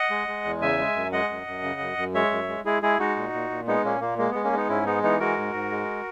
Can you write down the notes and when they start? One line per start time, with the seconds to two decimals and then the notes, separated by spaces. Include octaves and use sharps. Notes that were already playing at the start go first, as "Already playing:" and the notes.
Already playing: D#5 F#5
0.10 G#3
0.28 G#3
0.44 E2
0.62 C#3 E5 G#5
0.79 G#3
0.96 F#2
1.12 G#3 D#5 F#5
1.29 F#2
1.47 F#2
1.63 C#3
1.80 F#2
1.97 F#2
2.14 G#3 C#5 E5
2.31 F#2
2.48 G#3
2.65 G#3 E4 G#4
2.82 G#3 E4 G#4
2.99 G#3 D#4 F#4
3.16 A#2
3.33 A#2
3.50 A#2
3.67 G#3 B3 D#4
3.84 A#2 A#3 C#4
4.01 A#2 A#3
4.18 G#3 A#3
4.31 G#3 B3
4.44 A#3 C#4
4.52 G#3 B3 D#4
4.69 G#2 C#4 E4
4.86 G#3 B3 D#4
5.03 E3 B3 D#4
5.20 G#3 F#4 A#4
5.37 G#2
5.54 G#2
5.71 G#3